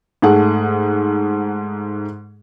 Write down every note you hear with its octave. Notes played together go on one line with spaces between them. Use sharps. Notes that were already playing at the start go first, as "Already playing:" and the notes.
G#2 A3 G#4 F#5